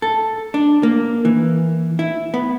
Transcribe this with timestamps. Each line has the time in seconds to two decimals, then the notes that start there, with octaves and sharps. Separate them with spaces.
0.02 A4
0.54 D4
0.83 A#3
1.25 E3
1.99 E4
2.34 B3